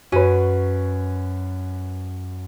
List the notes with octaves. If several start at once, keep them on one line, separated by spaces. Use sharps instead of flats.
F#2 C#4 F#4 B4 D#7